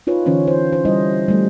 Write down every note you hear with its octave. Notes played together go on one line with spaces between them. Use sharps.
D#4 F4 B4 C#5
D3 E3 C#4 C5 C#5
C5
C5
G3 E4 C5 D#5
G3 A3